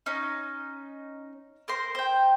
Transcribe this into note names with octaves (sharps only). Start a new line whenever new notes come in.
C#4 D#4
A#4 C5 C6
C5 G5